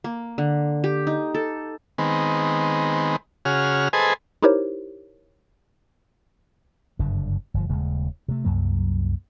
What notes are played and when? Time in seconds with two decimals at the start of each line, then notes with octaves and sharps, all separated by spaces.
0.04 A#3
0.38 D3
0.84 G4
1.07 D#4
1.34 A4
1.98 D#3 G#3 B3 C4
3.45 C#3 F#4 G#4 F6
3.93 G#4 A4 B4 C5 D#5 G#5
4.42 D#4 E4 G4 A#4 C5 C#5
6.99 F#1 G2 D3
7.54 G1 F3
7.69 D#1 C#3 G#3
8.28 C3 A3
8.44 C2 F#2 F#3 A#3